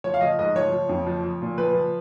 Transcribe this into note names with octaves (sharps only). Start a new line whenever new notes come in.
F3 C#5
F5
F3 D#5
G#2 D#5
F3 C#5
F3
F2
F3
F3
A#2
F3 B4
F3